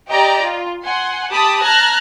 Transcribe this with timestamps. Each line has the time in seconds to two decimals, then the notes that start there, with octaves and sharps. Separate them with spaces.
0.10 G4 D5 D#5 G5 A#5
0.44 F4
0.84 F#5 G#5 C6
1.30 G4 A5 B5 D6 D#6
1.63 A5 A#5 F6 F#6 G#6 A#6